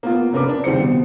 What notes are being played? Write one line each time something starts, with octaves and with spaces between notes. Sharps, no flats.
A#3 B3 F4
F1 C#4 A#4 B4 D6
D4
D#2 G3 C4 C5 C#7
B2